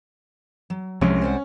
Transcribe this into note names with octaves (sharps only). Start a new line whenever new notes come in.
F#3
C2 C3 F3 G#3 C#4 D4
C5 D5 F#5